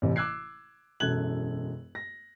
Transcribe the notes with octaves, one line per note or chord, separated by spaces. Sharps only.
A1 C3 E3
D6 E6 F#6 G#6 C7
E1 F#2 A4 F#6 G#6 F#7
A#6